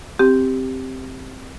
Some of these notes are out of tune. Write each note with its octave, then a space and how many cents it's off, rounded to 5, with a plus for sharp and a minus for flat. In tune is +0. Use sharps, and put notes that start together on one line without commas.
C4 +0 G4 +0